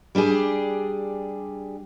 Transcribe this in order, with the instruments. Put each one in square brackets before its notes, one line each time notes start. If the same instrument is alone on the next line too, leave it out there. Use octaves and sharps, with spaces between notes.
[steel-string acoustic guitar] G3 D4 G4 G#4